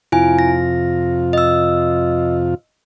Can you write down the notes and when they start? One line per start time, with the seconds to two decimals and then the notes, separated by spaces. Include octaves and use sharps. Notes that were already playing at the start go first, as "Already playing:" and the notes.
0.12 F2 C3 E4 F4 G#5
0.39 A#6
1.33 D#5 E6